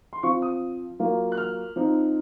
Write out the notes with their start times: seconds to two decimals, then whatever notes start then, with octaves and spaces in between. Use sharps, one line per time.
0.13 C6
0.23 F3 C4 F4 C#6
0.42 D#6
0.99 F#3 A#3 F4
1.32 F#6
1.37 F6
1.76 F3 C4 D#4